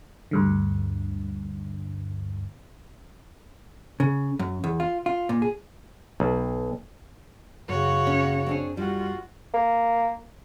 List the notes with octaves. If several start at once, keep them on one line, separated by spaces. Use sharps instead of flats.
D2 G2 D3
C#3
F#2
E2
F4
F4
A#2
G#4
B1
F#2 C#3 F#4 C#5
C#4
C4 D4 G#4
G3 F4 F#4
A#3